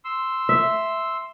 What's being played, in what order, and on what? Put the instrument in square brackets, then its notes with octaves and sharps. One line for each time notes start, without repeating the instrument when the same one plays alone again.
[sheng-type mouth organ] C6 E6
[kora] E5